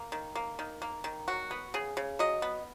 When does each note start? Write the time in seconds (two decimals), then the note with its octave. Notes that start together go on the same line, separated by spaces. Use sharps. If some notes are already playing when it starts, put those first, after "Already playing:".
Already playing: A#3
0.12 D#3
0.35 A#3
0.59 D#3
0.82 A#3
1.04 D#3
1.28 F#3 F#4
1.51 B3
1.74 C#3 G#4
1.97 C#3
2.19 F#3 D#5
2.42 B3